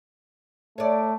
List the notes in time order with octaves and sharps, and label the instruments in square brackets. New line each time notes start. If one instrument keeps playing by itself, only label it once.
[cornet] A3 [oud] C#5 D5